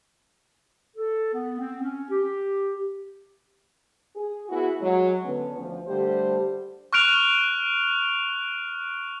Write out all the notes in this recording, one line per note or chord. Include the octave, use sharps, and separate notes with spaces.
A4
B3
C4
C#4
G4
G#4
B3 E4 F#4 G#4
F#3 G#3
D3 B3 C#4
D2 F3
D3 G3 A3 G4 C5
C#6 F6 F#6 D7 F7